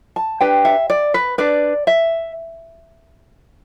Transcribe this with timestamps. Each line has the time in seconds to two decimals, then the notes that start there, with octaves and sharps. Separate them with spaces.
0.16 A5
0.41 D4 G4 B4 G5
0.65 E5
0.90 D5
1.14 B4
1.38 D4 B4 D5
1.87 E5